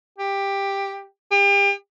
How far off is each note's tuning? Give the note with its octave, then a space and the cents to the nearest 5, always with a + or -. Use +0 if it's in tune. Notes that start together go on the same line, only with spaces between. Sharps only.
G4 +10
G4 +35